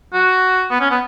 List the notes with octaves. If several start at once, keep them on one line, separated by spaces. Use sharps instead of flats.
F#4
B3
C#4
B3